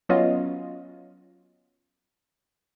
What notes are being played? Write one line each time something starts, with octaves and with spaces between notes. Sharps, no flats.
F#3 B3 C#4 F4 D#5